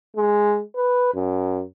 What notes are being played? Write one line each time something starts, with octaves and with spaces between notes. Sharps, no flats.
G#3
B4
F#2